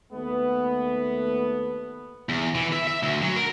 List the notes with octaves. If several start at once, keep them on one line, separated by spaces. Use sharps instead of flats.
D#2 A3 B3
E2
E3
E5
E5
D2
F#3
A#4